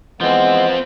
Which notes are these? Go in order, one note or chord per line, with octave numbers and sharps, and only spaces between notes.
E3 F3 G#3 B3 C4